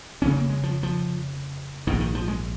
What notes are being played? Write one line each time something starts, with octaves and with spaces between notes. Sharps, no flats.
F1 F2 C#3 C#4
A#3
G#3
F3
F3
A#1 G#2 D#3
D#3
F3
G#3